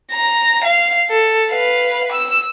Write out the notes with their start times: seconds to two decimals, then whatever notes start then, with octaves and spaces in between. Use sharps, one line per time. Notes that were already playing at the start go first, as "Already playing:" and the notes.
0.12 A#5
0.64 F5
1.10 A4
1.51 B4 F5
2.13 E6